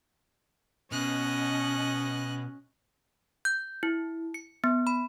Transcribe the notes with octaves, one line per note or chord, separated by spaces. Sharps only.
B2 C#4 D#5 F#6
G6
E4
C#7
B3
B5